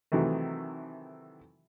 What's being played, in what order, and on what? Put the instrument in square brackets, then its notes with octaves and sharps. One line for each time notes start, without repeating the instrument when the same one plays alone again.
[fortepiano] C3 D#3 E3 F#3 A3